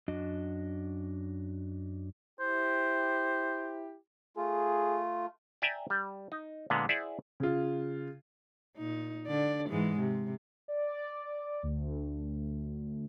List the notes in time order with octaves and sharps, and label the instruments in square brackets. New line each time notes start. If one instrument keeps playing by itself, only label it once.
[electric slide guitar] F#2 D4 F#4 D#5
[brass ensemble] E4 G4 [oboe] C5
[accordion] A3 F4 [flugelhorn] G#4
[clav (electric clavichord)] D5 E5 G5 G#5 A#5
G3
D#4
A#2 D3 G#3 B3
E4 G#4 C5 D5 E5 F#5
[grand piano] C#3 F4
[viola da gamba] A#2 D#4
D3 D5
G#2 E3 G#3
C3
[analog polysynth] D5
D2